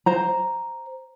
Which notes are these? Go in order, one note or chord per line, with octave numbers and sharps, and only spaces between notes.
C5 A#5